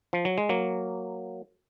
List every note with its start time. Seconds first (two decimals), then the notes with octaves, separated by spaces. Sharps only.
0.13 F3
0.25 F#3
0.38 G#3
0.49 F#3 A#3